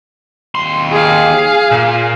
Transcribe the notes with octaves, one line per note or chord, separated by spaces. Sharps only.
D#2 C6
G#4 F5
A#2